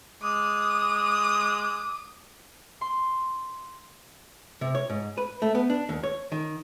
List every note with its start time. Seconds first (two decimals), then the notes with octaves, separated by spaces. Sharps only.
0.23 G#3 D6 D#6
2.81 C6
4.61 C3
4.75 C#5
4.90 G#2
5.18 B4
5.42 A3
5.55 B3
5.70 D4
5.89 D#2
6.03 C#5
6.32 D#3